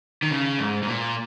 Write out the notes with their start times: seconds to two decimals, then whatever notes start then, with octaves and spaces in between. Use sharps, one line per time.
0.23 D#3
0.31 C#3
0.59 G#2
0.83 G#2
0.88 A#2